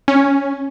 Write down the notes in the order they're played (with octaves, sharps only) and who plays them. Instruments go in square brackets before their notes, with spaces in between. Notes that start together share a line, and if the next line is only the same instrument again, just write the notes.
[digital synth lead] C#4